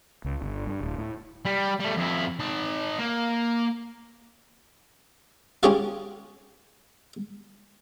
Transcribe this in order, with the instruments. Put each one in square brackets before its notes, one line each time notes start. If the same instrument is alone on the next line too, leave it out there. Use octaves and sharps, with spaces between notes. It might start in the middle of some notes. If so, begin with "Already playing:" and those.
[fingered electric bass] C#2
G1
G2
D1
A2
[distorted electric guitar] G3
G3 A3
F2 E4
D#4 A5
A#3
[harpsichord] C#4 F4 G4 G#4 C#5 F5